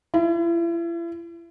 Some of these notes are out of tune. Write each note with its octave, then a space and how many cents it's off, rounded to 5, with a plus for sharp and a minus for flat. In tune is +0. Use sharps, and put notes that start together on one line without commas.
E4 +40